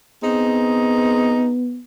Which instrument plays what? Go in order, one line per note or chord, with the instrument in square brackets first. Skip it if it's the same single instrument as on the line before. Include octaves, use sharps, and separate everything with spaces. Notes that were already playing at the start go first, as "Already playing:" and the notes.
[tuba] B3 [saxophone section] C4 D#4 G#4